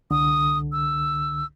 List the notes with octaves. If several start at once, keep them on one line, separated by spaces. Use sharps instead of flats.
C2 D3 D#6
E6